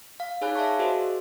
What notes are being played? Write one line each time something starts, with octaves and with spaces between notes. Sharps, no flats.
F5
D#4 G#4 C#5 G#5 B5 F#6
D5 E5 F5 A5 C#6
F#4 G#4 A#4 C5 D#5